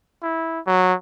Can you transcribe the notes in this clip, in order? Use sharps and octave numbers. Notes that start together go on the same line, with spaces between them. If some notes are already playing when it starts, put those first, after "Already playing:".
E4
F#3